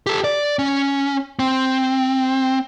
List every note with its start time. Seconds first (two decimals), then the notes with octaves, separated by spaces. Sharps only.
0.07 G4 A4
0.24 D5
0.59 C#4
1.39 C4